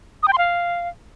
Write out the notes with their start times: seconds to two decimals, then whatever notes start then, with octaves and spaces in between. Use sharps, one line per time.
0.23 D#6
0.28 G5
0.33 C6
0.38 F5